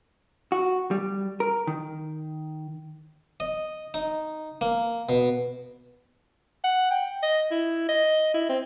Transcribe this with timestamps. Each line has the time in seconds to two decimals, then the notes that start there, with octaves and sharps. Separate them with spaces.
0.52 F#4
0.91 G3
1.40 A#4
1.67 D#3
3.40 D#5
3.94 D#4
4.61 A#3
5.09 B2
6.64 F#5
6.91 G5
7.23 D#5
7.51 E4
7.89 D#5
8.34 E4
8.49 C4